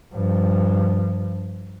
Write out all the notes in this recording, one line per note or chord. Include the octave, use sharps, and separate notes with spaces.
G2 F3